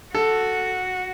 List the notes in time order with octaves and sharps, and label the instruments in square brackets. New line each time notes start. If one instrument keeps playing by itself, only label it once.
[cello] F#4 [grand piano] A4